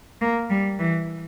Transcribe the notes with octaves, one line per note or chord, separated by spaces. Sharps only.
A#3
G3
E3